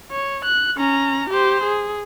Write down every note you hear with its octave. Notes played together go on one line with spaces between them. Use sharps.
C#5
F#6
C#4 A#5
G4 C5
G#4